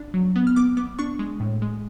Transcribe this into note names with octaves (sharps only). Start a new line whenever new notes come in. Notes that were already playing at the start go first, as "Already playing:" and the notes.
Already playing: D4
F#3
B3
F6
B3 D6
B3 D6
D4 C#6
G#3
A2
G#3